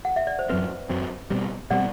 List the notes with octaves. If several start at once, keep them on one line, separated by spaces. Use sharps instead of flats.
F#5
E5
D5
C5
F#2 F#3 C4 B4
F#2 F#3 C4
B2 G3 C4
B2 G3 C4 D5 F#5